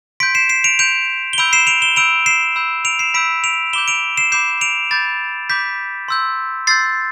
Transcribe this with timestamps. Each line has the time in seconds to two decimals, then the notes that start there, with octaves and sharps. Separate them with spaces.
0.20 C6 G6 B6 D7
0.35 C7 E7
0.49 C7 E7
0.64 D7 F7
0.79 C6 G6 D7 F7
1.33 G7
1.38 B5 E6 G6 D7 F7
1.53 C7 E7
1.67 D7 F7
1.82 E7 G7
1.96 B5 E6 G6 D7 F7
2.26 C7 E7
2.56 B5 E6 G6
2.85 D7 F7
2.99 C7 E7
3.14 B5 E6 G6 B6 D7
3.44 D7 F7
3.73 B5 D6 G6 E7 G7
3.88 D7 F7
4.17 C7 E7
4.32 B5 D6 G6 C7 E7
4.61 D7 F7
4.91 B5 D6 G6 A6
5.50 B5 D6 G6 B6
6.08 C6 E6 G6
6.67 C6 E6 G6 A6 C7